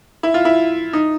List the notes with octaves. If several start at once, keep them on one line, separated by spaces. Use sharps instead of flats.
E4
F4
E4
D#4